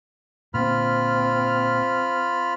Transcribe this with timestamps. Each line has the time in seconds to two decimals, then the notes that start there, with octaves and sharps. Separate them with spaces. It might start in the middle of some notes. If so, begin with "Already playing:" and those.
0.54 A#2 D3 C4 F4 B5 F6